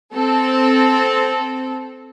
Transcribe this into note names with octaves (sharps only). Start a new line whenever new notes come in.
C4 A4